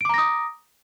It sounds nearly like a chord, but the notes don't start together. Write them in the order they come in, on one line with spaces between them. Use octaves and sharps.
D7 D6 A#5 A#6 D#6